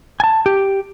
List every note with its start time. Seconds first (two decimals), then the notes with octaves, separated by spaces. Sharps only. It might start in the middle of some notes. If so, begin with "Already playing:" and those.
0.20 G#5 A5
0.46 G4